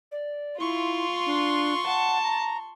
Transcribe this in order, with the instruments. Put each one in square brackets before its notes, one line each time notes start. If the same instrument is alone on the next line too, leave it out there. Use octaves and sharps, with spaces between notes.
[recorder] D5
[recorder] E4 [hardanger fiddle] F4 [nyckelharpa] C6 C#6
[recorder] D4
[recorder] F#5 [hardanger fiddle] A5
[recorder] A#5